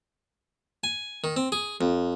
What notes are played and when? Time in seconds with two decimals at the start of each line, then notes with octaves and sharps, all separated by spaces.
0.84 G#5
1.24 D#3
1.37 C4
1.52 G#4
1.81 F2